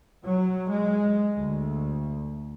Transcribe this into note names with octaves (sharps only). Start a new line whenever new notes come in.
F#3
G#3
D2